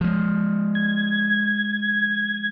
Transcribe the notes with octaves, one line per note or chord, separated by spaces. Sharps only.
F3 G#3
G#6